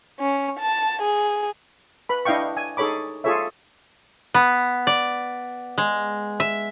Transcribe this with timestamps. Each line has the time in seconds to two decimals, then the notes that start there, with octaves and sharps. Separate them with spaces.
0.20 C#4
0.60 A5
1.02 G#4
2.09 B4 B5
2.25 D4 E4 D#5 F5 G5 C#6
2.57 G#5
2.77 D#4 G#4 A4 C#5 B5 D6
3.24 F4 G#4 A4 C#5 E5
4.34 B3
4.87 D5
5.78 G#3
6.40 E5